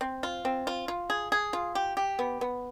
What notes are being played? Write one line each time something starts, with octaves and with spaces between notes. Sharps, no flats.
C4
F4
C4
F4
F4
G#4
G#4
F4
G4
G4
B3
B3